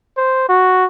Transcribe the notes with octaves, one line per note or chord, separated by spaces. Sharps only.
C5
F#4